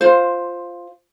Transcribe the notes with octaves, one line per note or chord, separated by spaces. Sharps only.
F4 C5